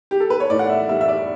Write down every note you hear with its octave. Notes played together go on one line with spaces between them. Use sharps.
G4
A4
B4
C#5
A2 D5
F#5
E5
G3 E5
E5
D5